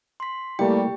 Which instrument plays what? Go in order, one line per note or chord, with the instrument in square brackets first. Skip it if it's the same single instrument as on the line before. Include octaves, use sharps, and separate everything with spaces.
[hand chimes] C6 B6
[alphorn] G3 [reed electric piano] A3 A#3 E4 [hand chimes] G4 G5